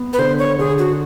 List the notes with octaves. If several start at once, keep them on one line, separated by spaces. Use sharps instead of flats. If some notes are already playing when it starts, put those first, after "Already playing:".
Already playing: B3
B4
D3 C5
C#5
D3 G#4
F#4